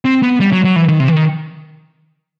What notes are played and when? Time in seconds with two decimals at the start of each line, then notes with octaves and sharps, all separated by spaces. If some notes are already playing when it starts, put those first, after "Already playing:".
0.05 C4
0.23 B3
0.40 G3
0.52 F#3
0.64 F#3
0.76 E3
0.88 D#3
1.00 C3
1.08 E3
1.13 D#3